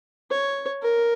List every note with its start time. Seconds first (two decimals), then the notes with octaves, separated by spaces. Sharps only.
0.31 C#5
0.83 A#4